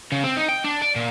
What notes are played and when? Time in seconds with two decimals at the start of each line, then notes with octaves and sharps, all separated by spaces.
0.12 C#3
0.24 C4
0.36 D#4
0.49 G5
0.64 D4
0.82 D5
0.96 A#2